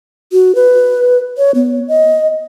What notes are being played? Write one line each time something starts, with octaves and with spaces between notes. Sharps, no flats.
F#4
B4
C#5
B3
D#5